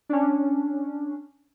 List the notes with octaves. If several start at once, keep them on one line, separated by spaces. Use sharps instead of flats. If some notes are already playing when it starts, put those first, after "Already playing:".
C#4 D4